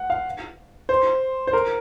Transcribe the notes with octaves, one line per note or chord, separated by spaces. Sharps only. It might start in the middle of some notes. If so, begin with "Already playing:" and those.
Already playing: F#5
F5
C5
C5
A#4